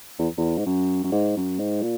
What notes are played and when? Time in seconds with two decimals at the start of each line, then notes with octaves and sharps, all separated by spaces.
0.19 E2
0.37 E2
0.57 G#2
0.66 F#2
1.04 F#2
1.12 G#2
1.36 F#2
1.59 G#2
1.82 A#2